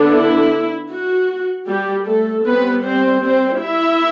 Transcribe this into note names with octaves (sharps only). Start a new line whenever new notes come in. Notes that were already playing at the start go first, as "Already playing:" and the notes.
Already playing: D3 B3 D4
E4
F#4
G3 G4
A3 A4
G3 B3 C4 B4
C4 C5
C4 C5
E4 E5